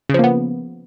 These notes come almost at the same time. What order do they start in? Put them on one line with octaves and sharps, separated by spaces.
C#3 F3 A#3 B3